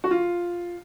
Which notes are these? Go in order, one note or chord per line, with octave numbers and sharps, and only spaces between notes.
F#4
F4